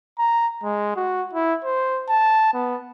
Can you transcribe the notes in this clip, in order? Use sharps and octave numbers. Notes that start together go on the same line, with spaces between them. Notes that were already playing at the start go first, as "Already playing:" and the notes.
A#5
G#3
F#4
E4
C5
A5
B3